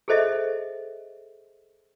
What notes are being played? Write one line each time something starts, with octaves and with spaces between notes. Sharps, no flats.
G#4 A4 C5 D#5 E5